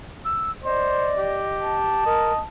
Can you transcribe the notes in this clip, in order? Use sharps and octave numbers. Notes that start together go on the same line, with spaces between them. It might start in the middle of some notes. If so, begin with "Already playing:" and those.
E6
C5 D5 D#5
G4
A5
A#4 D#5